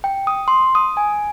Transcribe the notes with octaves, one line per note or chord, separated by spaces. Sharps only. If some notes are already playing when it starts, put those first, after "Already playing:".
G5
D#6
C6
D#6
G#5